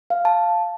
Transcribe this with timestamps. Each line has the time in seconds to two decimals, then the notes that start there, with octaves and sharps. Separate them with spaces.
0.10 F5
0.25 A5